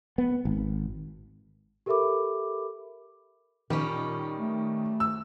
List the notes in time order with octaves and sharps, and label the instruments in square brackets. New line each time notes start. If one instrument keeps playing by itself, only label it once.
[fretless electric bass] B3
G#1
[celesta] G4 A4 A#4 E5 B5 D6
[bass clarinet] A#2 [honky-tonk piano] D#3 [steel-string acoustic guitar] G3 C#4
[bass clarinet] A3
[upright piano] E6